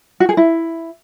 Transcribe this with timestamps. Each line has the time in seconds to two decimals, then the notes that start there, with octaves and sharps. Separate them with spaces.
0.20 F#4
0.29 G#4
0.37 E4